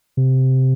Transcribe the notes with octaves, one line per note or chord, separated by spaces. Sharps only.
C3